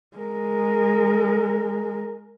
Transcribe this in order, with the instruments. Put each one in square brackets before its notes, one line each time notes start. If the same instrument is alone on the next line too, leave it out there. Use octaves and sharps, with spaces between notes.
[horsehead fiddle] G#3 A#4